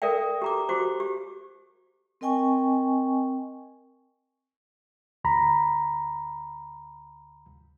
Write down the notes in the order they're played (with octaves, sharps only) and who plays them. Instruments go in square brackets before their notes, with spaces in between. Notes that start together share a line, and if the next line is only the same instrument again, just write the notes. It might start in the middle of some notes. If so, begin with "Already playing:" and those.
[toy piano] A4 A#4 D5 E5 G5
G4 A#5 D6
F#4 G4 C5 D6
G4
[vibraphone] C4 A#4 D#5 G5 G#5 C#6
[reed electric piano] D2 A#5 B5